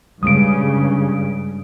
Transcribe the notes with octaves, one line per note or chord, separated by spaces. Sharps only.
G2 C#3 G3 G#3 G4 D#6 D7